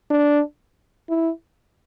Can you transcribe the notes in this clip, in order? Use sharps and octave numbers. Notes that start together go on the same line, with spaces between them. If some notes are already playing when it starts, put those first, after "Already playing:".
D4
E4